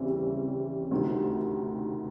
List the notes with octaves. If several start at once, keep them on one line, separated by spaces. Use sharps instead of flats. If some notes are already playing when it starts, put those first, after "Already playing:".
Already playing: D#2 C#3 E3 G3 C4
D2 C3 D#3